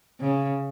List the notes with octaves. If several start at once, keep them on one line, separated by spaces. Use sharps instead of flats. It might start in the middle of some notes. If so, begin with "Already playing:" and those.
C#3